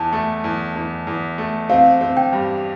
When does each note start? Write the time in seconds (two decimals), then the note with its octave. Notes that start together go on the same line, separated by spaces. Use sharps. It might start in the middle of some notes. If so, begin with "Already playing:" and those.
Already playing: E2 A5
0.12 A3
0.44 E2
0.76 E2
1.07 E2
1.38 A3
1.69 C4 F5
2.01 C4
2.17 G5
2.33 G2